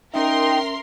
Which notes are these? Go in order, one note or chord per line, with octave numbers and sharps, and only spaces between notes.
C#4 D#4 A#4 E5 G5 C6